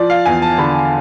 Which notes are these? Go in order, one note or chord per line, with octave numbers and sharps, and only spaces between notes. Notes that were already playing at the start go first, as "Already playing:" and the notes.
Already playing: F3 D5
F5
E2 G#5
A5
D3 B5